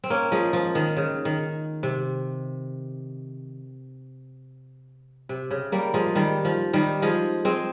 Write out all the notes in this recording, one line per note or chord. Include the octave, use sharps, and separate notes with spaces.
C4
A#3 C#4
F3 G#3
F3
D#3
C#3
D#3
C3
C3
C#3
G3 A#3
F3 G#3
D#3 G3
F3
D#3 G3
F3 G#3
G#3 C4